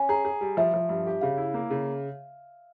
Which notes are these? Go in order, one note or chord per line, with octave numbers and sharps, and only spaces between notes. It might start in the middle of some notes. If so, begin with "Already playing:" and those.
Already playing: C#4 G#5
G#4 A#5
G#4
G3
F3 E5
F3
G2
G4
C#3 F5
E4
A#3
C#3